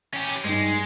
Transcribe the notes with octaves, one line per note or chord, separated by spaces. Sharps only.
C#4 G4
G2 G#3 D#4